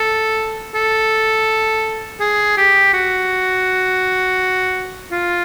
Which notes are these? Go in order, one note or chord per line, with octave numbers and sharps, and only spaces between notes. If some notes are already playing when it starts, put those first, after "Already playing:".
Already playing: A4
A4
G#4
G4
F#4
F4